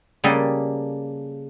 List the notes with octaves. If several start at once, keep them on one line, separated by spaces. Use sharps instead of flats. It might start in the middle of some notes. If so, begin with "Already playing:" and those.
C#3 G3 A#3 A4 D#5